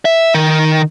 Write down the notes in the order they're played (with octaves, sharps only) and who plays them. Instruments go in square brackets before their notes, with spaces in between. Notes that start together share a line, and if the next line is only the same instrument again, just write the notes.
[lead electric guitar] E5
D#3